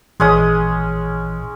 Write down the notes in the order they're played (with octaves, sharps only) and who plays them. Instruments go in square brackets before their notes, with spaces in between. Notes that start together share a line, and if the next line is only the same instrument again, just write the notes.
[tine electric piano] A1 A#2 E3 [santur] G#3 C#4 D#6